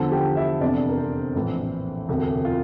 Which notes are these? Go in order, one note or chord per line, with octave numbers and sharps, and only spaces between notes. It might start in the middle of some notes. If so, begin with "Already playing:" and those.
Already playing: E2 D3 F3 A4 A5
G4 G5
E4 E5
F1 E2 C3 D4 D5
A#4
C4 C5
A#1 A2 E3
E1 D2 C3
F4